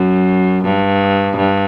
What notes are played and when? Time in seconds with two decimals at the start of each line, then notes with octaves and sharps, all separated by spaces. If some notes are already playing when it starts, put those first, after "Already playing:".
Already playing: F#2
0.65 G2
1.37 G2